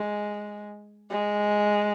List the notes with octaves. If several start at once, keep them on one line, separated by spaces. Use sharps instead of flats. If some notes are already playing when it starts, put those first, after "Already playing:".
Already playing: G#3
G#3